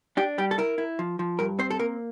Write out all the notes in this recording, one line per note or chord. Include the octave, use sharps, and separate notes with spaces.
D4 G4
G3 G4
A4
E4 A#4
E4
F3
F3
G2 A#4
C4 C5
A4
A#3 A#4